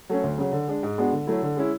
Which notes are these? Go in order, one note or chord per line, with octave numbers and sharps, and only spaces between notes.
F#3 A3 C#4
D2
C#3 F#3
D3
G#3 D4
G#2
G#3 B3 D4 F#4
D3
F#3 A3 E4
D3
G#3 C#4 E4